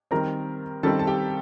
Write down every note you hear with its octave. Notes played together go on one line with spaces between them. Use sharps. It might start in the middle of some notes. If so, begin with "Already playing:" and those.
D#3 G3 C4 A#4 A#5
D#3 G3 C4 A4 A5
A5
G4 G5